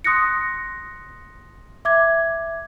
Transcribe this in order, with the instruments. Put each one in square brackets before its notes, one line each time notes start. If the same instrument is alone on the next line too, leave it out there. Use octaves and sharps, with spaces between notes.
[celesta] C6 D#6 F#6 A#6 C#7
E5 D6 G#6